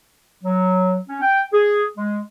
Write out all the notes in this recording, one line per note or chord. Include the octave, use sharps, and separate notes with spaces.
F#3
C#4
G5
G#4
G#3